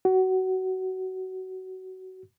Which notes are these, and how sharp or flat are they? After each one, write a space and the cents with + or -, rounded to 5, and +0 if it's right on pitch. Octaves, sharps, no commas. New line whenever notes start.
F#4 +20